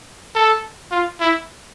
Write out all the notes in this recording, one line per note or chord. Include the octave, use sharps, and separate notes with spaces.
A4
F4
E4